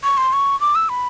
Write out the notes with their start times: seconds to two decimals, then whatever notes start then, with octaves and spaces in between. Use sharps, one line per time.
0.03 C#6
0.17 C6
0.33 C#6
0.61 D6
0.75 E6
0.89 B5